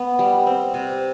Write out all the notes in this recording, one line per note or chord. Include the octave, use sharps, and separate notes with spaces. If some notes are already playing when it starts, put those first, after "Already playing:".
Already playing: B3
G3
C4
C3